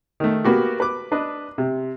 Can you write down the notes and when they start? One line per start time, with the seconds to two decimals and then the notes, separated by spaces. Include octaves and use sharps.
0.20 D#3 A3
0.44 A#3 B3 F#4 G4
0.80 B4 D6
1.12 D4 B4 D#5
1.58 C3